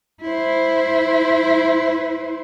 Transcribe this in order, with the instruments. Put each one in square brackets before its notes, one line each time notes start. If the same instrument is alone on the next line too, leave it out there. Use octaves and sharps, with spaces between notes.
[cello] E4 C5